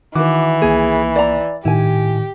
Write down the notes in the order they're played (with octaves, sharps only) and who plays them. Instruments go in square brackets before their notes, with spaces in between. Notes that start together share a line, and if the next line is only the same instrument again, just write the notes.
[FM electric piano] D#3 [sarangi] E3 [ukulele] F#4 B4 [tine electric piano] D6
[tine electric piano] C2 A#3 [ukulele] G#4
[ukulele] D5 A#5
[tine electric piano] A2 [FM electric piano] D#3 [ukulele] E4 G#5 [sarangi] G4